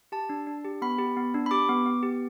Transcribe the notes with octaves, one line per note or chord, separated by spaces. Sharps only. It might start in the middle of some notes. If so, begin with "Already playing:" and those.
G4 A5
D4
D4
G4
B3 B5
G4
B3
D4
B5
G4 D6
B3
B3
G4